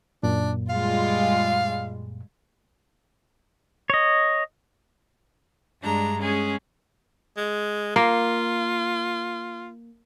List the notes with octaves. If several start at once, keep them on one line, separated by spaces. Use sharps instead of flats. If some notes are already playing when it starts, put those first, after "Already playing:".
F#2 A#2 D4
G3 G#3 F4 F5
C#5 D#5
G2 G#3 D4 A#5
G#3 C#4 G#4
G#3
A#3 F4